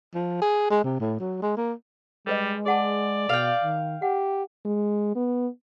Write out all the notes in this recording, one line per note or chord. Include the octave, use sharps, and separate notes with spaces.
F3
G#4
G#3
C3
A2
F#3
G#3
A#3
G3 G#3 A#4 B4 D#5
G#4 D5 F#5 A5
B2 F5 G5
D#3
G4 F#5
G#3
B3